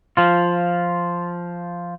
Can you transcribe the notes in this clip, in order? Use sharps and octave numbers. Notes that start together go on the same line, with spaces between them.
F3 F4